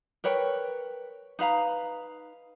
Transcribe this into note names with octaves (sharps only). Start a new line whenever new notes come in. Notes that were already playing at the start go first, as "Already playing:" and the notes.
A#4 B4 C#5 G5
D#4 B4 F5 A#5